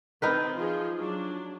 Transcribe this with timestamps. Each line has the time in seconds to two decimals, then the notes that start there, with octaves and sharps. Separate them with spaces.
0.22 D#3 C4 D#4 A#4 B4
0.58 F3 F4 G#4
0.99 F#3 D4